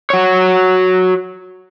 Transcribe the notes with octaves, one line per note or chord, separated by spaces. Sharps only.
F#4 C#5